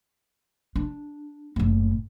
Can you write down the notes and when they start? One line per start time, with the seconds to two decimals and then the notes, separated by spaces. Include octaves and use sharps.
0.76 D4
1.56 F#1 A2